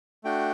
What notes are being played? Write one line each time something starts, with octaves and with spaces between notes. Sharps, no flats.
A3 D4 F#4 G5